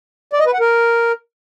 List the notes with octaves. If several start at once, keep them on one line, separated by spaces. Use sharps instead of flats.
D5
D#5
B4
F#5
A#4